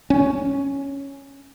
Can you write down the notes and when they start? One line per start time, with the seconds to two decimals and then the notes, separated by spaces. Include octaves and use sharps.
0.10 C#4